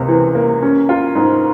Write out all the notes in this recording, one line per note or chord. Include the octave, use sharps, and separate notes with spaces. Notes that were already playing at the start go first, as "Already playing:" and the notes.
Already playing: C#2 C3 A#3
E3
A#3
C#4
F4
G#2